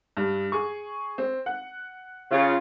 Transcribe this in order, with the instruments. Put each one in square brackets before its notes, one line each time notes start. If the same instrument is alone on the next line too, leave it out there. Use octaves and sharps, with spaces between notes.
[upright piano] G2
G#4 C#6
C4
F#5
[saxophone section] C#3 F4